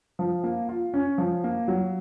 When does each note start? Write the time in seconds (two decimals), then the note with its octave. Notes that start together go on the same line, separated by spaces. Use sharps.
0.19 F3
0.44 A#3
0.69 F4
0.94 C#4
1.18 F3
1.44 A#3
1.68 F#3